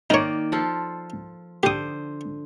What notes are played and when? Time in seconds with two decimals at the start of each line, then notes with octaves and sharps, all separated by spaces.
0.10 D#3 A#3 D#4 C#5 D5
0.52 F3 F4 A4
1.63 D3 G4 C5 D#6